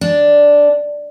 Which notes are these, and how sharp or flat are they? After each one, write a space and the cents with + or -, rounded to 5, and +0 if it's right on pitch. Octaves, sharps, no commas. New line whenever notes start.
D4 -5